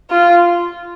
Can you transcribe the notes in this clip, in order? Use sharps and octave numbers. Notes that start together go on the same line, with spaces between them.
F4